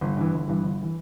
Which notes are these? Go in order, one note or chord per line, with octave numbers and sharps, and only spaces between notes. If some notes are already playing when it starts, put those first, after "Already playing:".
G1
G2 E3
G1
G2 E3
G1
E3